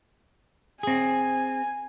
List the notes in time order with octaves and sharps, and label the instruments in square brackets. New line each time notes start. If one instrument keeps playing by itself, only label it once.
[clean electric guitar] C4 G#4 [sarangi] G#5